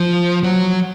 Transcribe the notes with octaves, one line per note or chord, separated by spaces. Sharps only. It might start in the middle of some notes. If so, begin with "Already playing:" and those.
Already playing: F3
F#3